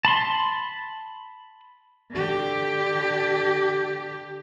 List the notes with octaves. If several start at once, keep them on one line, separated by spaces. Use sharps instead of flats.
A5 B5 C6
D3 G4